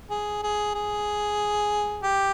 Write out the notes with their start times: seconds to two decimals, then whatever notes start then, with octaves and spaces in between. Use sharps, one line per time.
0.10 G#4
0.43 G#4
0.75 G#4
2.03 G4